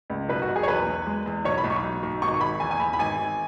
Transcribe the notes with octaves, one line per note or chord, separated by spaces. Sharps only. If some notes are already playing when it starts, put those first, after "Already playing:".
C#2
B1 B4
F#4
B1
G#4
C#5
E2 B4
E2
G#3
E2
B1 C#5
B5
B1
C#6
B1
B1
G#1 C#6
C#6
G#1 B5
E2 G#5
G#5
E2 B5
B5
G#1 G#5
G#1